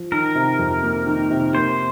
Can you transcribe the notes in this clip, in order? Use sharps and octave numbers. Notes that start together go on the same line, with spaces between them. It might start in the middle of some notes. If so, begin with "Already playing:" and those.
Already playing: F3
D#3 A#4
C3
F2
A#3
D#3
C3
A#3 C5